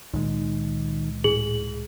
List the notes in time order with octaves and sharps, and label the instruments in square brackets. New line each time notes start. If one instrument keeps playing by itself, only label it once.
[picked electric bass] C#2 A#2 G#3 [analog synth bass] D#3
[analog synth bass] A2 [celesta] G#4 F#7